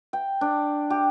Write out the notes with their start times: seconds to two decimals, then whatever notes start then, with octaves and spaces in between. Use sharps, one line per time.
0.13 G5
0.41 D4
0.90 G4